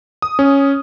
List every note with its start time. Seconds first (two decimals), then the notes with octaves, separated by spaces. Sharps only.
0.22 D#6
0.39 C#4